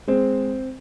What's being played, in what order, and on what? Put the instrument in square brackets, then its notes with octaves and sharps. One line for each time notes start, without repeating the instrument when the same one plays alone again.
[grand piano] G#3 C4